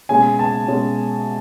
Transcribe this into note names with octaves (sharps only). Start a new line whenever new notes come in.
B2 G#3 C#4 G#5
A5
B2 G#3 C#4